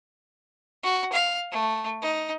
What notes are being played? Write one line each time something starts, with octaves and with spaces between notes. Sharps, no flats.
F#4
F5
A3
D#4